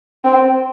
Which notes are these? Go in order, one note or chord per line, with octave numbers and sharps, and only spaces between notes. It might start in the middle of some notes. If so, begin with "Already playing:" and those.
C4